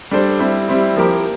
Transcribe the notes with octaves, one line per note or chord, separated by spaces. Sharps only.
G3 D4 A4 C5
G3 C4 E4
G3 C4 E4
F3 A#3 E4 G4 A#4